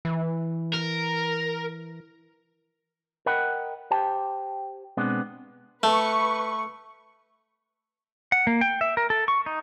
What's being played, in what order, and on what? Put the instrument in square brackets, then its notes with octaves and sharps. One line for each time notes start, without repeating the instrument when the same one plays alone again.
[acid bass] E3
[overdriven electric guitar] A#4
[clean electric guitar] A#4 D#5 F#5 G5 B5
G4 C5 G5 A5
B2 G#3 B3 C4 D4
[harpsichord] A3 [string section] B4 C#6
[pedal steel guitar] F#5
A#3
G5
E5
A#4
A4
C#6
D#4